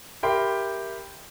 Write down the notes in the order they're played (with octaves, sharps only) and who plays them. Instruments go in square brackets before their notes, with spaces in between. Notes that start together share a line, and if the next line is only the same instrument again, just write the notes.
[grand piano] G4 A#4 E5 G5 B5 C6